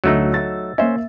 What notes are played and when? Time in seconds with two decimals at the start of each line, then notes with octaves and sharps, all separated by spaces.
0.04 D2 F#3 A3 D#4 E6
0.34 A6
0.78 A#3 C#4 C5 E5